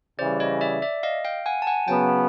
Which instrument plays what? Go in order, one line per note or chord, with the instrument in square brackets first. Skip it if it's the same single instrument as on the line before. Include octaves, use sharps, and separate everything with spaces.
[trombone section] C#3 E3 G3 [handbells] C5 D5
[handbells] C#5 D#5
D5 E5
D5 E5
D#5 F5
F5 G5
F#5 G#5
A5
F#5 G#5
[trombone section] C#3 F#3 B3 [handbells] G5 A5